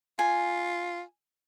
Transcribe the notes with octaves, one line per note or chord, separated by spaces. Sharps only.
F4 G#5